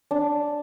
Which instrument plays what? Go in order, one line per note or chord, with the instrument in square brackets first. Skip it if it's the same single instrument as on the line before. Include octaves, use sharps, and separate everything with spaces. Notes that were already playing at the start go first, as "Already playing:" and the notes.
[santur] D4